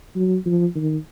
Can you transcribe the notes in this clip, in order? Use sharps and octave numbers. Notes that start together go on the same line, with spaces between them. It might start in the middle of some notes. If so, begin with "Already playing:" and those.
F#3
F3
D#3